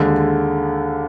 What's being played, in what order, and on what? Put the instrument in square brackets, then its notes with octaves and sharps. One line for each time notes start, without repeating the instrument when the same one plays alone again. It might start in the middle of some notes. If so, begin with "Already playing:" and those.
Already playing: [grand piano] D#2 D3 G#3